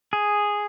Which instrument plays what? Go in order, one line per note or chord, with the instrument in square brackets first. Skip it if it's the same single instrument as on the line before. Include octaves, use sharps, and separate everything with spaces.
[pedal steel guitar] G#4